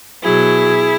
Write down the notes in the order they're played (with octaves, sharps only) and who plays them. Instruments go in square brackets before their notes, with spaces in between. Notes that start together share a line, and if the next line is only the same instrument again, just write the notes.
[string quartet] B2 F#3 E4 G#4